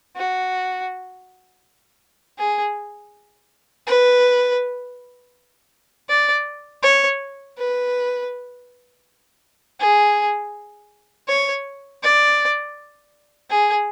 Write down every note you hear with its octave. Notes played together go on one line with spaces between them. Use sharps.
F#4
G#4
B4
D5
C#5
B4
G#4
C#5
D5
G#4